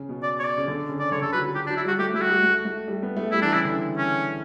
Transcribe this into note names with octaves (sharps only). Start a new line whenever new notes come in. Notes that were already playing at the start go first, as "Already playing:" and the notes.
Already playing: C#3
B2
D5
C#5
D5
C#3
D3
C#3
D5
D3 C#5
D3 A4
F#3 B4
F#3
F#3 G4
D4
F#3
E4
G3 F#4
A3 G4
A3 E4
F#4
G3
A3
A3
G3
B3
A3
G3 E4
E3 D4
C#3 E4
D3
C#4